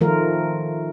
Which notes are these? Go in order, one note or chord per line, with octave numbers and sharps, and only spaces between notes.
D#3 F3 A3 F4 A#4